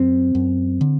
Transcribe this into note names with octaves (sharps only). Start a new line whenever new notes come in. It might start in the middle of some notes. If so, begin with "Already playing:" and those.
Already playing: F#2 C4
F#2
D3